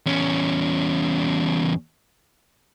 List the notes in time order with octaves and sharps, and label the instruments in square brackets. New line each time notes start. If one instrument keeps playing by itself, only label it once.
[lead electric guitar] E2 C#4